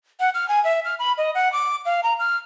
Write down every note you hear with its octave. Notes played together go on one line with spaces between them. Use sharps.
F#5
F6
G#5
E5
F6
B5
D#5
F#5
D6
F5
A#5
F6